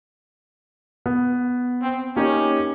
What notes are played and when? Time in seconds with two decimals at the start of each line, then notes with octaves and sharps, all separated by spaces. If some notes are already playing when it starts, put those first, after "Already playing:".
1.06 B3
1.82 C4
2.16 A#3 C#4 D#4 G4